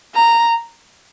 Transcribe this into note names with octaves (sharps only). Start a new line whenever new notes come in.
A#5